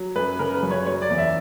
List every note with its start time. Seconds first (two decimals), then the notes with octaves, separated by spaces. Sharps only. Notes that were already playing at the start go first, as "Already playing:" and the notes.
Already playing: F#3
0.15 F#2 B4
0.39 C#3 A#4
0.55 B4
0.63 F#2
0.71 C#5
0.86 F#3 C#5
1.02 D5
1.10 E2
1.18 E5